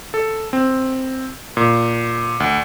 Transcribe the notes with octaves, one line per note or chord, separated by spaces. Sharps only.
A4
C4
A#2
D2